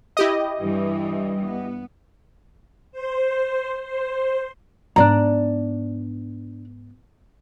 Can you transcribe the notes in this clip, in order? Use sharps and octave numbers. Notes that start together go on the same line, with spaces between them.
E4 G4 D#5
G2 E3 G3
B3
C5
C5
G#2 B3 D4 D5 A#5